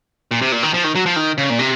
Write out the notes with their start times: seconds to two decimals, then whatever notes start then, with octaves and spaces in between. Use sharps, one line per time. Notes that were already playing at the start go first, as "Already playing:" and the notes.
0.31 A#2
0.41 C3
0.52 A#2
0.63 D#3
0.74 F3
0.84 D#3
0.95 F#3
1.06 F3
1.16 D#3
1.38 C#3
1.50 A#2
1.59 C3